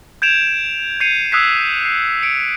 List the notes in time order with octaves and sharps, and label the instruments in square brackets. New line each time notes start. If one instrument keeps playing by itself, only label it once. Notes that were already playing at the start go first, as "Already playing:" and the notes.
[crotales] G6 G#6 D7 E7 F7
G6 G#6 C7 C#7 D#7 F7
D#6 E6 F#6 G#6 B6 C7
C7
C#7 D7